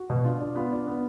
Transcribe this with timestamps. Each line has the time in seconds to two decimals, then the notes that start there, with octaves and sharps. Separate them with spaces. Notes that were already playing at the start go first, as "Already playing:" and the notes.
Already playing: F#4
0.10 B2
0.24 D4 F4
0.41 D4
0.55 B3 F4
0.72 D4
0.87 B3